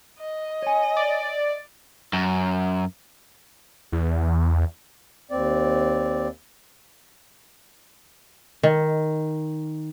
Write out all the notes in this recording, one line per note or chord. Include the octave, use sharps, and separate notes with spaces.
D#5
C#5 G#5
D5
F#2
E2
D#2 C4 D5
D#3